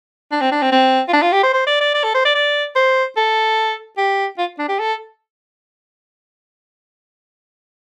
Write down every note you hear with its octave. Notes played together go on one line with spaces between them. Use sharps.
D4
C4
D4
C4
C4
F4
D4
F4
G4
C5
C5
D5
D5
D5
A4
C5
D5
D5
C5
A4
G4
F4
D4
G4
A4